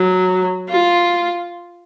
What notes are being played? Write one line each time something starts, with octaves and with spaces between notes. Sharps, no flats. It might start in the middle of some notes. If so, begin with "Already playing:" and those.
Already playing: F#3
F4